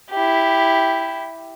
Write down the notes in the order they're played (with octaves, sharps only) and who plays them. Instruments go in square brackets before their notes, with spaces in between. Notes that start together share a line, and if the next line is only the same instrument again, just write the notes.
[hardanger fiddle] E4 G4